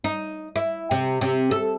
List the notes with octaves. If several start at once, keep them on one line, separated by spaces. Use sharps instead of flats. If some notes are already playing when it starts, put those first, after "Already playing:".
D#4
E4
C3
C3
A4